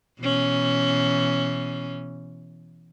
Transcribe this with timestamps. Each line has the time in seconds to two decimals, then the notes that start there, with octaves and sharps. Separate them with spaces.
0.20 B2 E3 C#4